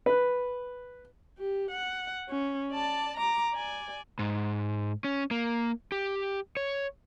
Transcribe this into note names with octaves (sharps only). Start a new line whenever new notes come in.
B4
G4
F#5
C#4
D5 A5
A#5 D6
D5 G#5
G#2
C#4
A#3
G4
C#5